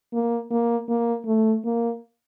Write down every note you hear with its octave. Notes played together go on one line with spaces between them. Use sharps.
A#3
A#3
A#3
A3
A#3